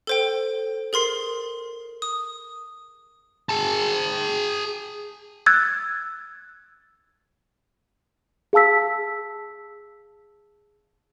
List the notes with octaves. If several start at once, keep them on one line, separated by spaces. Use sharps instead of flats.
A4 C5 G5
G#4 A#4 C6 C7
D#6
G#4 A5
E6 F#6 G#6 A6
G#4 F5 A5 E6 B6